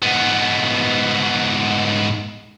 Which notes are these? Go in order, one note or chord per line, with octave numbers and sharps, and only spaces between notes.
G#2 B3